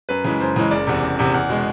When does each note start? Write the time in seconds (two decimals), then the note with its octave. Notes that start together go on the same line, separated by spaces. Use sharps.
0.09 F#2 B4
0.25 C#3 E3 G#3 B4
0.40 F#2 C5
0.56 C#3 E3 G#3
0.71 F#1 D5
0.87 E2 C3
1.03 F#1
1.19 E2 C3
1.34 E2
1.49 B2 G#3